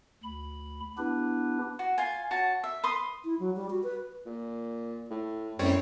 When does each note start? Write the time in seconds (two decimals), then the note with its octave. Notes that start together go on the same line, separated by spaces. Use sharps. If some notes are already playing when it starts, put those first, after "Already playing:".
0.24 D2 B5
0.98 B3 D4 E4 G4 B4
1.79 F#4
1.98 F4 G#5
2.31 F#4 C#5 A5
2.64 E5
2.84 B4 C6 D#6
3.25 E4
3.40 F#3
3.56 G3
3.70 F#4
3.84 B4
4.26 A#2
5.10 A2
5.59 F#2 A2 G3 C4 C#5